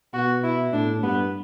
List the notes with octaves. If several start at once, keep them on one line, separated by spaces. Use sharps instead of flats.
B2 F#4
E4
A2 D4
G2 B3